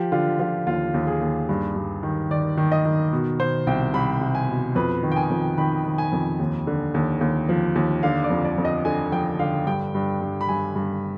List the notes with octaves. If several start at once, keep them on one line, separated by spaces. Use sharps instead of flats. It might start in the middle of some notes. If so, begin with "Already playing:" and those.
Already playing: F3 G4
D3 F4
F3 F4
D#2 F4
D#2
G#4
D#2
G2
G2
D#3
D#3 D5
D#3
D#5
D#3
B2
B2 C5
C2 G5
C2 B5
C2
G#5
B2
F2 B4
D#3
G5
G#5
F2
D#3 B5
D#3
G#5
F2
D#2
D3
D#2
D#2
F3
D#2
D3 F5
D5
F2
D5
F2
D#5
D3 G#5
F3 G5
D3 F5
G2 G5
G2
G2
B5
G2 G#5
G2